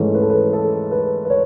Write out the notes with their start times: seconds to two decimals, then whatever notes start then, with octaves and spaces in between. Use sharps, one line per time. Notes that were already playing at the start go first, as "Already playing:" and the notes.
Already playing: G#2 E3 A3 C#4 B4
0.15 B4
0.22 A4
0.30 B4
0.53 A4
0.91 B4
1.25 B4
1.30 C#5